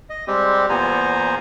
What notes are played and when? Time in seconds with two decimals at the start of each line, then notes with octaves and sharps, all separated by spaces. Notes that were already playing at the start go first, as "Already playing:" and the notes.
0.10 D#5
0.27 G3 G#3 C4 G4
0.69 E2 A#2 B3 C5 G#5 A#5